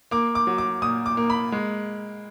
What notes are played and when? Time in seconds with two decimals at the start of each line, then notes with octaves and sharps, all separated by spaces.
0.11 A#3 D6
0.35 D6
0.47 F#3
0.58 D6
0.82 A#2 D#6
1.06 D6
1.17 A#3
1.30 B5
1.52 G#3